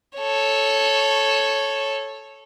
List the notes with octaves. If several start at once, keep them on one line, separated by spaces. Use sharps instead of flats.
A4 C#5